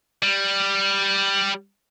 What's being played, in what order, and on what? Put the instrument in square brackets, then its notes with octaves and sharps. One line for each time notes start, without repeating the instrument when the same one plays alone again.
[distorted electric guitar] G3